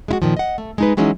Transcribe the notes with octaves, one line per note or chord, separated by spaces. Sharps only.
G#3 E4 F#4
A#2 D#3 F3
D#5 F#5
A3
G#3 D#4 B4
E3 F#3 G#3 C#4 D#4 E4